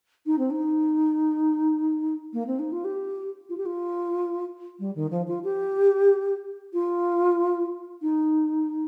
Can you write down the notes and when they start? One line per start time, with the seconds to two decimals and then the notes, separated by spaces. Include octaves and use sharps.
0.26 D#4
0.38 C4
0.50 D#4
2.33 A#3
2.46 C4
2.58 D#4
2.71 F4
2.84 G4
3.49 F4
3.57 G4
3.65 F4
4.79 G3
4.95 D#3
5.10 F3
5.27 F4
5.43 G4
6.73 F4
8.01 D#4